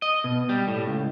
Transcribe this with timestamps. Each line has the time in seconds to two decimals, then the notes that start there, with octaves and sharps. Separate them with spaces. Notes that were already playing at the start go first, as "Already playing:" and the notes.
0.02 D#5
0.24 B2
0.49 G3
0.68 A2
0.88 C#2